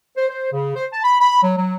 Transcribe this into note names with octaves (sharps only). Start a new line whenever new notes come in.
C5
C5
C#3
C5
A5
B5
B5
F#3
F#3